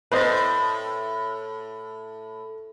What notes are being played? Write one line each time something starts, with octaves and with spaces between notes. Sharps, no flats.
A2 B4 C5 D#5